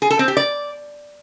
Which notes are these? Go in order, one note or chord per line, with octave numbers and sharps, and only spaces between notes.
G#4
A4
C4
G4
D5